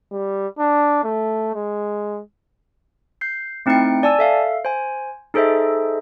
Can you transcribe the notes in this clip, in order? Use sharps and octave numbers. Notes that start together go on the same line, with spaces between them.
G3
D4
A3
G#3
G6 C7
A3 C4 D#4 E4 G5 C#7
D5 G#5 A5 E6
A4 E5 F5
C5 G#5
D#4 G#4 A4 C5 D#5 E5